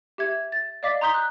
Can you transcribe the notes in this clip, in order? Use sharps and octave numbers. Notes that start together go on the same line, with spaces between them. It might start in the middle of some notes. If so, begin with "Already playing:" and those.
G4 E5 G#6
A6
D5 D#5 F5 D6 A6 B6
A#5 C6 D#6 G6 B6 G7
F#6